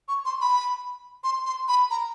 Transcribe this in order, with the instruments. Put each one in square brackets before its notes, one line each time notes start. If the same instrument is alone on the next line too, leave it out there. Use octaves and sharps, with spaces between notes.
[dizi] C#6
C6
B5
C6
C6
B5
A#5